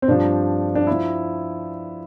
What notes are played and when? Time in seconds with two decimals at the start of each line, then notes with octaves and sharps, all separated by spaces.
0.02 C4
0.08 G2 F3 D4
0.75 D4
0.87 F3 E4